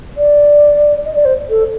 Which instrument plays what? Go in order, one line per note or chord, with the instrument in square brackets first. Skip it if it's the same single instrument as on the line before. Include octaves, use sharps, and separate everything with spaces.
[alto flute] D5
D#5
D5
C5
A4